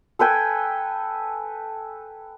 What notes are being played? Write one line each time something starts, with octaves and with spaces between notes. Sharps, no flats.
A4 B4 G5 G#5